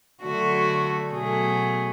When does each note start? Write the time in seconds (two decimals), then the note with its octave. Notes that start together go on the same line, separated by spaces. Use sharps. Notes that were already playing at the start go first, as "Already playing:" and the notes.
0.23 D3 F#3 A3 F#4
1.13 B2 F#3 A3 G#4